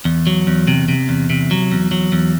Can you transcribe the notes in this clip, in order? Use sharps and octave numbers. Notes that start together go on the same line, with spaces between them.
E2
F#3
E2
C3
C3
E2
C3
F#3
E2
F#3
E2